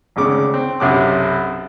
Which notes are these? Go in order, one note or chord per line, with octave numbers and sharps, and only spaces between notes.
G#1 D2 C#3 D6
C4
B1 F#2 C3 F#3 D6